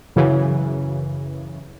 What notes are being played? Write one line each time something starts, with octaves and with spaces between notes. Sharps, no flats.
F#2 C#3 E3